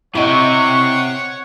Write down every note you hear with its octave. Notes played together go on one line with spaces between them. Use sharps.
C3 E4 G4 C#5 D#5 F#5 C#6